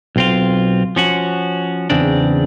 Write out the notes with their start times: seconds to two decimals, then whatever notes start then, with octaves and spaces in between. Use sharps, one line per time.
0.16 B1 C4 F4
0.96 F3 C#4 F#4
1.90 E2 C#3 C4 D4